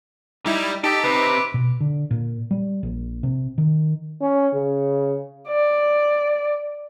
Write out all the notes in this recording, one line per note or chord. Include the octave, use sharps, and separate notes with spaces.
G3 D#4 E4
D#4 G4 A4 D6 B6 D7
C3 B4
B2
D3
A#2
G3
A#1
C3
D#3
C#4
C#3
D5